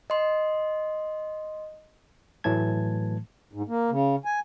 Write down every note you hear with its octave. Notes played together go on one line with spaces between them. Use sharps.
D#5 C6
A2 E3 F#3 A3 A5 G#6
G#2
A#3
C#3
G#5